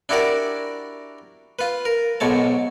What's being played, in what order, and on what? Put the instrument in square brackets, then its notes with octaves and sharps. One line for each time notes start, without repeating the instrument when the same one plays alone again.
[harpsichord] D4 E4 F#4 G4 A#4 D5
F4 B4
A#4
B1 G#2 B2 C#5 A5